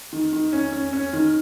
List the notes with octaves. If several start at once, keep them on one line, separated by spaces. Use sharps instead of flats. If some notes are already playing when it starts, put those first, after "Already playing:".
D#3
D#3
C#4
C#4
C#4
D#3